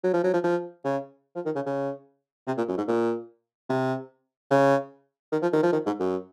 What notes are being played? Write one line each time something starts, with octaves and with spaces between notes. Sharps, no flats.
F#3
F3
F#3
F3
F3
C#3
F3
D#3
C#3
C#3
C3
A#2
F#2
G#2
A#2
C3
C#3
D#3
F3
D#3
F3
D#3
G#2
F#2